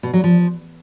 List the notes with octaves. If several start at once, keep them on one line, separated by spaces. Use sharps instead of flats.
B2
F#3
F3